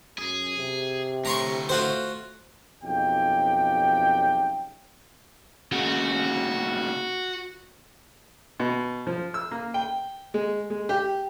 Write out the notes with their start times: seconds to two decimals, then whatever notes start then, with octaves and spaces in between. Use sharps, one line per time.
0.18 F#2 G#4
0.57 C3
1.25 D2 A2 A#5 C6 C#6
1.69 A3 F4 F#4 C5
2.84 B1 F2 C#3 D#4 G4 G5
5.72 D#2 C#3 F#4
8.60 B2
9.07 F3
9.34 E6
9.51 A#3
9.74 G5
10.34 G#3
10.70 G#3
10.89 G4